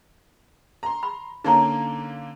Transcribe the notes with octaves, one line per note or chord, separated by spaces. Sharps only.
A#5 C6
B5
D3 A#3 C#4 D#4 A#5